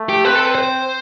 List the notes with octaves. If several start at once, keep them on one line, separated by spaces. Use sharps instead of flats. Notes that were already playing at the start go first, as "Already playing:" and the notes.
Already playing: A3
G4
C4 B4
A4
B4
C5